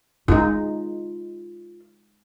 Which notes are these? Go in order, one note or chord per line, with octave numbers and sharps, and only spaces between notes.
G#3 D#4 F4